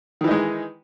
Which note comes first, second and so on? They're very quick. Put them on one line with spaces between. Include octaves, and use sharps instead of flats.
D#3 E3 D#4 G#3